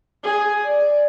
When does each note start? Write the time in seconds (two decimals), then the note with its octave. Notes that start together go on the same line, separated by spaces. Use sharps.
0.23 G#4
0.64 D5